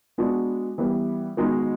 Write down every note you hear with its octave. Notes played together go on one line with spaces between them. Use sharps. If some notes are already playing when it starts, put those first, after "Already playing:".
G#3 B3 D4 F#4
E3 G3 B3 E4
D#3 G#3 B3 D#4 F#4